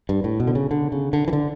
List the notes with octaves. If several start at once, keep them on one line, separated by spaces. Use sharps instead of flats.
G2
A2
B2
D3
C#3
D3
C#3
D3
E3
D3